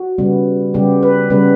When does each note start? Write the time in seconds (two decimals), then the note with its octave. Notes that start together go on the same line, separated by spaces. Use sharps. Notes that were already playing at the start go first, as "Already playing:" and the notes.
Already playing: F#4
0.18 C#3 G3 B3
0.74 C#3 G3 B3 G4
1.03 B4
1.30 C#3 G3 B3 B4